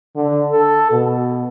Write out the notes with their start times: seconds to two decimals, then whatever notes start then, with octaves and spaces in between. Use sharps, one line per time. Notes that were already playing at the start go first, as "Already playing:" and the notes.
0.16 D3
0.52 A4
0.91 B2